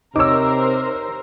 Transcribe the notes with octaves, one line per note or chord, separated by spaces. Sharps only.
C3 D#4 A#4 C5 C#5 D6 E6